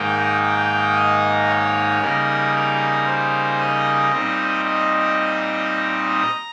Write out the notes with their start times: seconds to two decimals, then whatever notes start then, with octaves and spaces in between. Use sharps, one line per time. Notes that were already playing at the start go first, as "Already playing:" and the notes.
Already playing: G#2 D#3 A#3 D#4 G5
0.43 G5
0.96 D#5
1.48 C#5
2.01 C#3 G3 A#3 D#4 A#4
2.54 A#4
3.06 C5
3.59 D#5
4.12 A#2 G3 C4 D#4
4.65 D#5
6.22 A#5